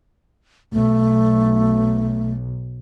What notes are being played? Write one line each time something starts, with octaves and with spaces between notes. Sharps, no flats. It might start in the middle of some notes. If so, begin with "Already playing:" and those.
B1 A3